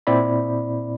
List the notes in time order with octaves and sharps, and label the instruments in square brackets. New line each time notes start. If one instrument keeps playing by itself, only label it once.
[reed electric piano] A#2 C4 E4 D5 B5